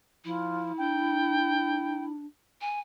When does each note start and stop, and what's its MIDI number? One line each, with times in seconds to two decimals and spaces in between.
0.25 0.72 53
0.25 2.09 64
0.78 2.25 62
0.78 2.04 79
2.61 2.80 80